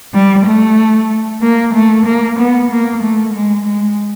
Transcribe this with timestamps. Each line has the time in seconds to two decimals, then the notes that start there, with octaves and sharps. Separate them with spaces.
0.14 G3
0.45 A3
1.42 A#3
1.74 A3
2.05 A#3
2.38 B3
2.71 A#3
3.03 A3
3.34 G#3
3.66 G#3